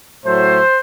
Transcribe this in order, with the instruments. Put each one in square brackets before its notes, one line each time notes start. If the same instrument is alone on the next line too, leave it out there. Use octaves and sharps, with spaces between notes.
[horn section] A2 F#3 A3 C5